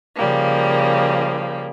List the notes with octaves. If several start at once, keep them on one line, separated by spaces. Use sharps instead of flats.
C#3 F3 G3 A#3